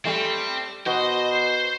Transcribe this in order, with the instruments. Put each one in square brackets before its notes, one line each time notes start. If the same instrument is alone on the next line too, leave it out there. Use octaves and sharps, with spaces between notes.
[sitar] G3 A3 [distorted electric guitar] C4
[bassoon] B2 [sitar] F#4 [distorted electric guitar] C5 [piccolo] D#5
[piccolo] C7